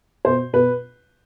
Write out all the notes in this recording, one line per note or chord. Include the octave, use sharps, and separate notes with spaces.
B2 C5
B2 B4